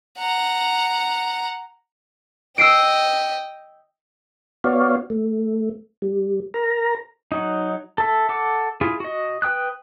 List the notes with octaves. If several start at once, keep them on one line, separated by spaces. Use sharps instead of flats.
F#5 A#5
D#5 G5 E6 C7 D7
B3 F#4 C#5 D5 F5
A3
G3
A#4 A#5
F#3 D#4
A4 E5
A4 F#5 D6
E4 F4 G#4
F#4 D#5
B4 G5 D#6 F#6